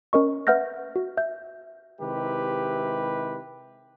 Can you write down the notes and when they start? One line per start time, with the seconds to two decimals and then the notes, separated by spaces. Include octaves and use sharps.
0.13 C#4 A#4 D#5 C#6
0.47 B4 E5 F#5 F6 G6 A#6
0.96 F#4
1.17 E5 G6
2.01 C3 D#3 G#3 E4 G4 B4